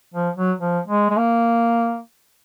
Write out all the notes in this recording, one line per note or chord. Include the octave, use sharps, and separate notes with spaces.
F3
F#3
F3
G#3
G#3
A#3